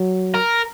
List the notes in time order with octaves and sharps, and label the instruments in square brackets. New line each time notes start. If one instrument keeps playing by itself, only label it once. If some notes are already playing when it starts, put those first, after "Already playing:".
Already playing: [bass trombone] F#3
[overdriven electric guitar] A#4